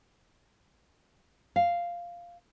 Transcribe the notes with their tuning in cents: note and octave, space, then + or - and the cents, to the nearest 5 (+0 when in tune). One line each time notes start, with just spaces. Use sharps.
F5 -5